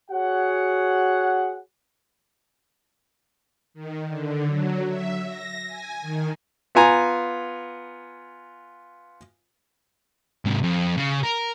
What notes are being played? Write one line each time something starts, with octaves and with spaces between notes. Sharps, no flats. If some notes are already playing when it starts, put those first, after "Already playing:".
F#4 G#4 C#5 F#5
D#3
D3
F#3
E5
A#6
G#5
D#3
B3 F4 G#5 A#5
G#2 C3
F2
C#3
A#4